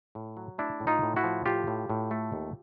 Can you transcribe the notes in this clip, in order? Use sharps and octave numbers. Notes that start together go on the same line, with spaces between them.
A2
F#3
A3 D4 E4
A2
D#4 F4
A2
E4 F#4
F3
A2 F4 G4
A2
A2
A3
D#2